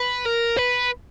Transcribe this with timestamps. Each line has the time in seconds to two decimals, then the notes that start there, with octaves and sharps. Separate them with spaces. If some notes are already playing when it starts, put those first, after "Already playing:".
Already playing: B4
0.26 A#4
0.57 B4